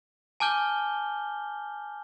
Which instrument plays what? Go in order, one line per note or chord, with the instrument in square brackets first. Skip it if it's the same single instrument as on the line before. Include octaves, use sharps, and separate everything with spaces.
[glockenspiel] G#5 A5 D6 F6 G6 G7